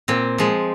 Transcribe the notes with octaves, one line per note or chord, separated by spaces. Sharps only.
A#2 C4
F3 G#3